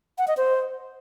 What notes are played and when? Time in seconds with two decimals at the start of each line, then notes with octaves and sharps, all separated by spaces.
0.18 F#5
0.28 D#5
0.37 C5